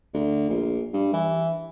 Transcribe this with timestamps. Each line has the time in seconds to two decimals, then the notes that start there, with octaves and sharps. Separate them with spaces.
0.14 D2
0.50 A#1
0.93 G2
1.13 E3